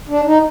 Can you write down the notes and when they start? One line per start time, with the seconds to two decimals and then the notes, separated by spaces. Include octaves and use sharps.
0.09 D4
0.26 D#4